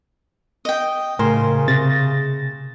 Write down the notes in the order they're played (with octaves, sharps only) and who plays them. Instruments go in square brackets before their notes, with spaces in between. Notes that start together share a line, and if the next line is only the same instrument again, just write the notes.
[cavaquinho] D#5 G5
[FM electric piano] A2 [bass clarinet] C#3 [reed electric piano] A#4 G#5 C6 [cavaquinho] C5
[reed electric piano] C3 [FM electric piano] A6 A#6